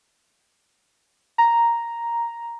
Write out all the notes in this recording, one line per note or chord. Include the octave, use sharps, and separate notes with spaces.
A#5